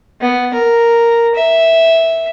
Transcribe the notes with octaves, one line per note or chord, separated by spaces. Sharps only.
B3
A#4
E5